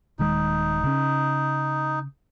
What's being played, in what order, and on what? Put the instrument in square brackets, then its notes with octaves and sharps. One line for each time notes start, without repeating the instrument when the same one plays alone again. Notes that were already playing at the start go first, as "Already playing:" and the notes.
[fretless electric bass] D#1 D#3 G#3 [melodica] D#4
[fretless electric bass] C#3 C#4